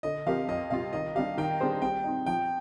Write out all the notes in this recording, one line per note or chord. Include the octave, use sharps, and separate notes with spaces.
D3 D#5
F3 C4 G4 A#4 F5
F2 D#5
C3 G3 C4 F4 F5
D#3 D#5
G3 D4 G4 F5
D#3 G5
G3 D4 G#4 C5
G3 G5
C4 D#4
F3 G5